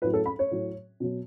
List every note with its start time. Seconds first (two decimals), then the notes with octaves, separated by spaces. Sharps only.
0.02 A2 F#3 B4
0.14 A4
0.26 B5
0.39 C#5
0.51 A2 F#3
1.00 B2 F#3